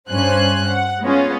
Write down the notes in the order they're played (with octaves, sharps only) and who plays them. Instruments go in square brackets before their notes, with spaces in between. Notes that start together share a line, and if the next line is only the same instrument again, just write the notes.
[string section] G2 C#4 C5 G#5 F#6
F#5
G#3 B3 C#4 F4